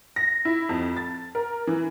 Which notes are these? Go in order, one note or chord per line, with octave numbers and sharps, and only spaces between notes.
A#6
E4
F2
A6
A#4
E3